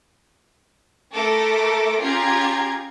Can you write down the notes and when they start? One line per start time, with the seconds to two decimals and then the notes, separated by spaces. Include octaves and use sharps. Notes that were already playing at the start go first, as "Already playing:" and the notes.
1.13 A3 A4 A#4 D6 A#6
2.00 C#4 F4 G4 G#4 A#5 G#6